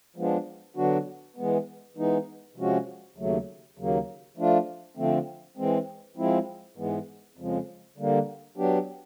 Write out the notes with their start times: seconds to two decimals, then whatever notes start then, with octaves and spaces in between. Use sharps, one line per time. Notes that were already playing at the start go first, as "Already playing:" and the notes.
0.16 F3 G#3 B3 D4
0.76 D3 F#3 B3 D4 F#4
1.36 E3 G#3 B3
1.97 E3 G#3 B3 D#4
2.56 C3 F3 G#3 C#4 F#4
3.16 D#2 C#3 F#3 A3
3.77 D#2 C#3 F#3 A#3
4.37 F3 A3 D4 F4
4.97 D3 F3 A3 C4
5.57 E3 G#3 C4
6.17 F3 G#3 C4 E4
6.77 G#2 E3 G#3 B3
7.37 F2 C#3 F3 G#3
7.98 D3 G3 A#3
8.57 F#3 B3 D4 G4